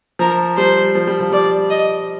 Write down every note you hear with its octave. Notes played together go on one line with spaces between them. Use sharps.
F3 A#4
G3 C5
F3
G3
F3
G3 D5
D#5